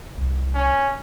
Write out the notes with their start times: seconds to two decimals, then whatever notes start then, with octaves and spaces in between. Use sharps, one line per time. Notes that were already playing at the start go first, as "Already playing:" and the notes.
0.18 C2
0.55 C#4